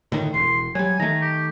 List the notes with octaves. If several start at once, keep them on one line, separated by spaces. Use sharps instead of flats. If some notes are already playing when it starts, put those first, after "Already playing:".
A2 D3 D#3
E1 C6
F#3 G3 G#5
D#3 A3 A#5
G4